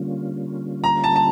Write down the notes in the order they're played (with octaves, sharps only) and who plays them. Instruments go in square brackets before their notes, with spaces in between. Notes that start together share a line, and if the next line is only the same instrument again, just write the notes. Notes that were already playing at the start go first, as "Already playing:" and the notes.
Already playing: [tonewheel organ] D3 G3 A#3 C#4 F4
[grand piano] A#5
A5
A5